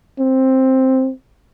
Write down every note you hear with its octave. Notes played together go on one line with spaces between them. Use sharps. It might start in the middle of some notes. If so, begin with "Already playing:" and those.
C4